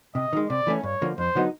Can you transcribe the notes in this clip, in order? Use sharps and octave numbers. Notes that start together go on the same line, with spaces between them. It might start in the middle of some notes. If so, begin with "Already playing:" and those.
C3 D#5
D#3 G#3
C3 D5
E3 A3 C#4
G2 C#5
D3 F3 A#3
F2 C5
D3 F#3 B3 D#4